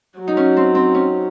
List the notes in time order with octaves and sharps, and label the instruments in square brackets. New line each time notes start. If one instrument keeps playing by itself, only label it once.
[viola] F#3
[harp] D#4
C#4
C4
C4
C#4